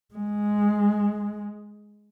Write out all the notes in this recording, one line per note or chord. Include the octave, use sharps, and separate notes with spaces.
G#3